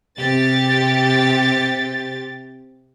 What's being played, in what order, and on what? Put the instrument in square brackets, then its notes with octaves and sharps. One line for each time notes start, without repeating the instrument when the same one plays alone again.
[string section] C3 G4 A6